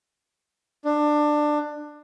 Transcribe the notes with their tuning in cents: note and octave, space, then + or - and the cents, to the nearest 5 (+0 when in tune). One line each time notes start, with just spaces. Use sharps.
D4 +20